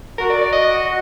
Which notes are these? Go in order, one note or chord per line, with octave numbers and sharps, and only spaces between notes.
F#4 A#4
D5
D5
D#5